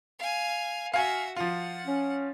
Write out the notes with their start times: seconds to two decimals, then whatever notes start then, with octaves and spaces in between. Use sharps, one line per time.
0.19 F5 G#5
0.94 F#4 E5 F5 G#5
1.36 F3 F4 F#5
1.86 C#4